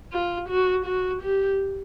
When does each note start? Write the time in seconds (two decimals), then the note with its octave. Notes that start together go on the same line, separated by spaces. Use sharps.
0.12 F4
0.49 F#4
0.86 F#4
1.22 G4